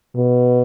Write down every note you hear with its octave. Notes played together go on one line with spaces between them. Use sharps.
B2